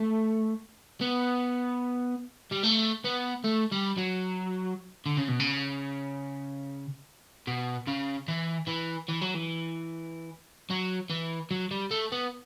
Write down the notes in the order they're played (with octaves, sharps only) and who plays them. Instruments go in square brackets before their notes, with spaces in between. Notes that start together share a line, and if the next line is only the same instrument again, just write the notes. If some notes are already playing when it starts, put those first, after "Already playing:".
Already playing: [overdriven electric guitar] A3
B3
G3
A3
B3
A3
G3
F#3
D3
C#3
B2
C#3
B2
C#3
E3
E3
E3
F#3
E3
F#3
E3
F#3
G3
A3
B3